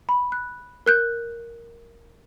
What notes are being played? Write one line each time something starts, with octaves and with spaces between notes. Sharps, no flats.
B5
F#6
A#4 F#6 G6